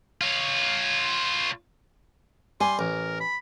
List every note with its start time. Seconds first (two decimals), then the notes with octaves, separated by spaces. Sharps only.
0.21 F4 C#5
2.61 G3 G#5 C6
2.79 A1 A#4
3.20 B5